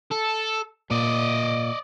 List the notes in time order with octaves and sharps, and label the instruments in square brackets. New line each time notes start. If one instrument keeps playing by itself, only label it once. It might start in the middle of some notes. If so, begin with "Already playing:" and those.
[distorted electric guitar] A4
[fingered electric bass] A#2 [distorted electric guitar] D5 D#5